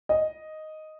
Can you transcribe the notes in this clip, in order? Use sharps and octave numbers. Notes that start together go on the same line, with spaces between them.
D#5